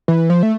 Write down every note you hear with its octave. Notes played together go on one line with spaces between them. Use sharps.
E3
F3
A3